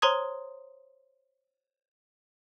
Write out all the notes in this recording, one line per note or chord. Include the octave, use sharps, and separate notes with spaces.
C5 C#5 A#5 C6 D#6 G#6